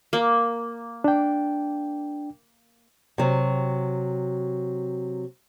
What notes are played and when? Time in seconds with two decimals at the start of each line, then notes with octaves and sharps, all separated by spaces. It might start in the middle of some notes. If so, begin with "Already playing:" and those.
0.13 A#3
1.04 D4 G5
3.18 C3 F#3